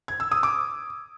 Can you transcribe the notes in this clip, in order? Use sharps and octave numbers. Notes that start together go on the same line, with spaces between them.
G#6
E6
D#6
D6